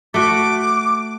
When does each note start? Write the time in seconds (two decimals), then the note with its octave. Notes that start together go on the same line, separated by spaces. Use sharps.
0.14 A3 F#4 D6